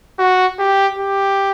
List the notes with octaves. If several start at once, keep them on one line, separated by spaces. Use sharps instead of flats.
F#4
G4
G4